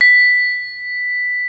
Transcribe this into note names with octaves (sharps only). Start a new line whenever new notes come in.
B6